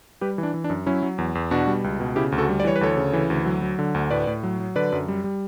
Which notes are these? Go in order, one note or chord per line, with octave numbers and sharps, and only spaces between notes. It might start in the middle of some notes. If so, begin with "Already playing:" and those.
G3 G4 B4
E3
D4
E3
D4
F#2
F#3 C#4 E4
F#3
E2
E2
B2 D4 F#4
G3
C#2
B2
C#3 E4 G4
D2
F#4 A4
G3
D5
E3 C#5
B4
D2 A4 C#5
C#3
E3
D2
F#3
F#3
D3
D2
A2 B4 D5
A2
F#3
F#3
D3 B4 D5
F#2
G3
G3